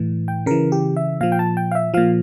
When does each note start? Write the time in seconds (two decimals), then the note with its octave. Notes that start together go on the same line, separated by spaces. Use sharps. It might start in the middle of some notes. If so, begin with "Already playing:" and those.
Already playing: A2 E3
0.28 G5
0.46 C#3 E3 A#4
0.72 G4
0.96 E5
1.21 A#2 F3 F5
1.32 G5
1.39 A5
1.57 G5
1.71 F5
1.75 E5
1.94 A#2 F3 F5